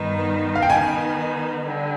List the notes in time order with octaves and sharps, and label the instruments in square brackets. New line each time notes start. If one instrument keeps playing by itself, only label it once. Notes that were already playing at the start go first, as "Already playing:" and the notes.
Already playing: [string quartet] G2 D#3 B3 D#4
[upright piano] F5
G5
[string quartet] D#3 B3 D#4 [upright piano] G#5
[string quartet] D3 G3